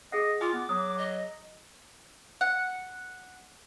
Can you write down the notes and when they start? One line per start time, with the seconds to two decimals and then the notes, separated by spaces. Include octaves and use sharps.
0.12 G#4 D#5 F#5
0.41 F4 G#5 D6
0.53 B3
0.69 F#3 D#6
0.98 D#5
2.41 F#5